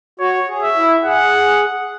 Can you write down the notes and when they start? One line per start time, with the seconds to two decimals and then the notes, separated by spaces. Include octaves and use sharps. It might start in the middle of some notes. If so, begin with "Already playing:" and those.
0.20 F#4 C#5
0.48 G#4
0.63 E5
0.76 E4
1.05 G#4 F#5